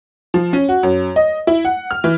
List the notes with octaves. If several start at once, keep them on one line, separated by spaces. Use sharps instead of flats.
F3
C#4
F#4
F#2
D#5
E4
F#5
F6
E3